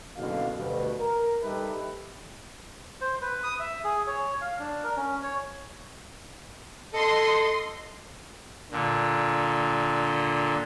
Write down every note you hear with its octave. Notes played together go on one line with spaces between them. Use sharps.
F#1 B2 D3 F#3 F5
D2 G2 B2
A#4
G3 D#4 G4 A4 B4 E5
C5
B4
D#6
E5
G#4
C#5
F5
D4
A#4
C#4
C#5
A4 D#5 C6
A#2 D3